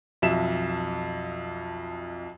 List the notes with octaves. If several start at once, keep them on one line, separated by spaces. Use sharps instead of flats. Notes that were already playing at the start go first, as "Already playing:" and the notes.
B1 F2 E5 E7